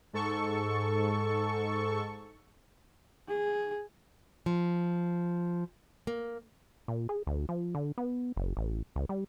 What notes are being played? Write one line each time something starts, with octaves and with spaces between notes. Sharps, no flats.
G#2 A4 C#6
G#4
F3
A#3
A#2
G#4
D2
F3
D3
B3
F#1
A1
C#2
G3